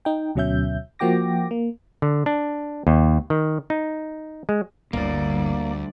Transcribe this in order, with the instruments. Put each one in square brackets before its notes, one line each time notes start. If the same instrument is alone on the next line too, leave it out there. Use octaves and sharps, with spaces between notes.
[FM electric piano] D#4 G5
D2 B2 F#3 C#4 E5 G6
F3 A#3 F#4 G5 D6 A#6
A#3
[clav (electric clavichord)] D3
D4
D#2
D#3
D#4
G#3
[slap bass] G1 A2 [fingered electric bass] D2 [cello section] G3 D5 [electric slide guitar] A#3